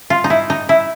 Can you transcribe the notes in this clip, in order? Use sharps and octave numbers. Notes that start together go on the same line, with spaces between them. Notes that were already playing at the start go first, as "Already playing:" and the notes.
F4
D#4
E4
D#4
E4